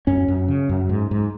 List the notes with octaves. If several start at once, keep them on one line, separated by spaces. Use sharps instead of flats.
F#2 C#4
F#2
C#3
F#2
G#2
G#2